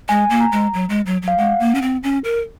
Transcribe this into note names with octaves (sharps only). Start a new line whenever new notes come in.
G#3 G#5
A#3
A#5
G#3
F#3
G#3
F#3
F#3
F5
G#3 F#5
A#3
C#4
C4
C#4
A#4